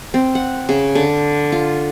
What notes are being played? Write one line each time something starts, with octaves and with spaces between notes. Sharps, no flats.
C4
F#5
C#3
D3
F4